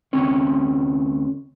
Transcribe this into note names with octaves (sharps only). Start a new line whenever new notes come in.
D2 C4 C#4 C#5